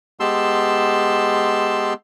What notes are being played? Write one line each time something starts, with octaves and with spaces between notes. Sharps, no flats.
G#3 B3 G4 A5 C6 E6